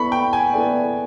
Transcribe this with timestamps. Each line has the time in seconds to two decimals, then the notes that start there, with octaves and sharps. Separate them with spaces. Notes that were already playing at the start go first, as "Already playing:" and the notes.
Already playing: B3 E4 A4 D5 B5 C#6
0.12 G5
0.33 G#5
0.53 B3 E4 A4 D5